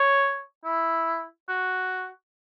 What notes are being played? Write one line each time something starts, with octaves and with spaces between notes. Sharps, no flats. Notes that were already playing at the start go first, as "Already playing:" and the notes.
Already playing: C#5
E4
F#4